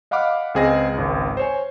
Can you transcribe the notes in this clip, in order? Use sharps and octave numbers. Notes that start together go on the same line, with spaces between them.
D#5 F5 F#5 B5 D6 F6
C#2 C4 G#4 D#5 A#6
G#1 C#2
C5 C#5 G#5